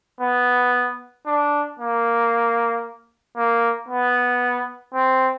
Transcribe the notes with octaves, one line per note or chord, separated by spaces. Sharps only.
B3
D4
A#3
A#3
B3
C4